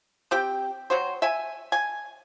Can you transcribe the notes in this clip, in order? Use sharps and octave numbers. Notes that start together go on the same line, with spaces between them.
C4 G4 G5
F#3 F#4 C5
E5 G#5
G#5